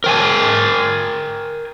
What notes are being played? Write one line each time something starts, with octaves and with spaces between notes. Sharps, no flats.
A#4 G5 G#5